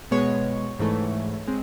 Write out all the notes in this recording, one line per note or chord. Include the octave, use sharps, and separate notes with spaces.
B2 G#3 B3 C#5
G#2 E3 A3
G#3 C4